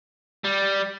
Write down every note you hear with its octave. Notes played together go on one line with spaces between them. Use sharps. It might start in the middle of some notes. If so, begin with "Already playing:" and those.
G3